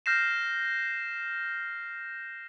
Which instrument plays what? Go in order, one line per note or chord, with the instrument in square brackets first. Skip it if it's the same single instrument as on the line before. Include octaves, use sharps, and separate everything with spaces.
[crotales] F6 G6 A#6 C7 E7